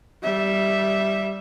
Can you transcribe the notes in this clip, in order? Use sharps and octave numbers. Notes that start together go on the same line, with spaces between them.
G3 E5